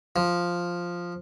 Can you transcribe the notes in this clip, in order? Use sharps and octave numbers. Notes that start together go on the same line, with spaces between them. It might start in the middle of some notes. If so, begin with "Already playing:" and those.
F3